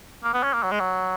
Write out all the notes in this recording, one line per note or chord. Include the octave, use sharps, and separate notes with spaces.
A#3
B3
C#4
A#3
F#3
G#3
F#3